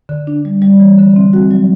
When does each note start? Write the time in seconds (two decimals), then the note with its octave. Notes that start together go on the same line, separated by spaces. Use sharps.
0.09 D3
0.27 D4
0.45 G3
0.62 G3
0.80 E3
0.98 D3
1.16 C4
1.33 F#4
1.51 F#3